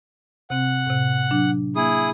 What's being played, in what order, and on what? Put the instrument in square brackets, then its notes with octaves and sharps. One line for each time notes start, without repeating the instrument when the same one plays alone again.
[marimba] C3 C4 [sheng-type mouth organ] F#5
[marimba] A2 C3
F#3 D4
[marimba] A#3 [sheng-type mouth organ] E4 G#4 D#6